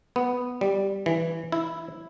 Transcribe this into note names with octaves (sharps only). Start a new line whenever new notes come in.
B3
G3
E3
E4